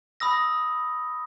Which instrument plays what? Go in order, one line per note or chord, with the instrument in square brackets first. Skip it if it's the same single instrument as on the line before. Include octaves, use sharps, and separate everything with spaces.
[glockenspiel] B5 D#6 E6 A#6